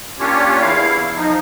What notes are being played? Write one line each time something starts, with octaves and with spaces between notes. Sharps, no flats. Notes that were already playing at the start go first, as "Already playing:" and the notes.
A#3 C#4 D4 F4 G4 C#5
E2 E4 F5
F3 D#4